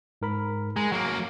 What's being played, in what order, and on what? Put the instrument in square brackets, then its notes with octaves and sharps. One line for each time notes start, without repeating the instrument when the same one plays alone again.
[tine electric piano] G#2 A#4 B5
[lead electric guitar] G#3 [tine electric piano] A#5
[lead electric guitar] F#3 A#3